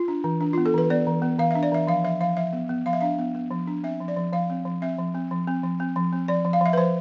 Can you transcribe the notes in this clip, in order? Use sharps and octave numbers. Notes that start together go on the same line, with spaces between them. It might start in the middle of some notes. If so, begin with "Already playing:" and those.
Already playing: F4
D4
E3
D4
B3 F4
A4
E3 B4
B3 D5
E3
B3
E3 F5
D4 E5
D5
E3 E5
F3 F5
F3 E5
F3 F5
F3 E5
B3
B3
F3 F5
E5
D4 F5
B3
B3
F3
D4
C4 E5
F3
D5
F3
F3 F5
C4
F3
C4 E5
F3
C4
F3
C4
F3
C4
F3
C4
F3 D5
F3
F5
F3 E5
B4
F3 C5